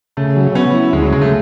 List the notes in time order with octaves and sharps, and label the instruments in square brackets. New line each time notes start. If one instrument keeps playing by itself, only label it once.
[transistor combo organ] C#3 [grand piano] A3
[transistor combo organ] F#3
[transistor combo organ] B3 [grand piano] C#4
[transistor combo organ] E4
[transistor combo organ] D2 [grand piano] G#3
[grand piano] F#3
[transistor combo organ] C#3 [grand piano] G#3
[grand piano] A3